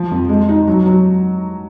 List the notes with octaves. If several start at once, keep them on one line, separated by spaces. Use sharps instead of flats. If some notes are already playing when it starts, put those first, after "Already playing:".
Already playing: F3
F2
G#3
D#4
F#3
F#3